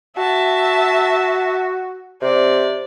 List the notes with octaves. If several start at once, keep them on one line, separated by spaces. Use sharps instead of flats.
F#4 E5 A5
C3 D5